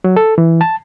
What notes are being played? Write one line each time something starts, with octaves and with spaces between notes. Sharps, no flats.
F#3
A4
E3
A5